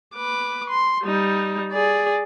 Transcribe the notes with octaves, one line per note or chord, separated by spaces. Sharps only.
B4 D6
C6
G3 D#4
G#4 D5